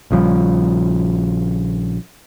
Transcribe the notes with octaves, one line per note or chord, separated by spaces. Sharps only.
A#1 C#3 F3 G3